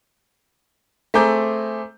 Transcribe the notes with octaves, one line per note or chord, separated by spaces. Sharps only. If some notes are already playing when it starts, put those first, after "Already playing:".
A3 C4 G#4 A#5 D6 G6